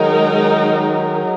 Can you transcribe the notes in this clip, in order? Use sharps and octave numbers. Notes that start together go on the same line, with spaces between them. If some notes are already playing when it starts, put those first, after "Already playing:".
Already playing: D#3 F#3 G#3 D#4 A#4